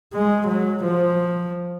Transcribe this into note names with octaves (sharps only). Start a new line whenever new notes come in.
G#3
F#3
F3